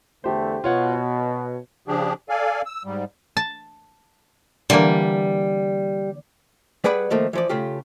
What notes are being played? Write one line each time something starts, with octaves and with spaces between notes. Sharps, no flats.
E2 D3 A3 G4 C5
B2 F4 C#5 F#5
C#5
C#3 F3 D4 G4 G#4
A4 D5 F5 G#5
E6
G#2 G3
A5
D3 E3 G3 A#3
G3 G#4 B4 D5 F#5 B5
D#3 F3 A3 A#3
E3 F3 D5
C#3 A3 F4 G4